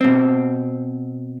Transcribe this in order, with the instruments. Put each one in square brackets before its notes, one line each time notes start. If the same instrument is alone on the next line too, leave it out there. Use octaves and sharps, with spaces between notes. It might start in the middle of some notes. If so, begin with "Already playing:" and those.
[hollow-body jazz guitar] B2 C4